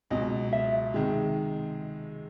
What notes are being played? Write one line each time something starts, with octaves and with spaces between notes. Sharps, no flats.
C#2 B2 F#3 D#5
E5
C3 D#3 G#3